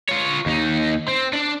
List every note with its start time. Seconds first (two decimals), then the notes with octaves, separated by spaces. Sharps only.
0.09 F4 C#5
0.46 D#2 D#4
1.08 C4
1.33 D4 D5